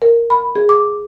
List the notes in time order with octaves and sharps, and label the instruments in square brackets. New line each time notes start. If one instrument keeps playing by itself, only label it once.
[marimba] A#4
B5
G#4
D6